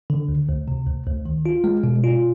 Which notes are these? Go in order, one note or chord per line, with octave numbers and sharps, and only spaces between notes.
D3
D2
D2
C3
D2
D2
D#3
F4
G#3
B2
F4